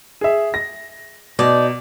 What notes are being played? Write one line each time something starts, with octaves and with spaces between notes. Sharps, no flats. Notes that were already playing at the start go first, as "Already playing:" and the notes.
G#4 E5
A#6
B2 D#4 D5